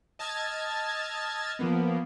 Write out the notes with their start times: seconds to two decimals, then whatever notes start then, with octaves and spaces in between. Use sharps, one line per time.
0.19 D#5 A5 E6 F6 G#6 A6
1.59 F3 A#3 B3